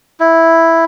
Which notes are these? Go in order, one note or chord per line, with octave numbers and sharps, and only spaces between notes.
E4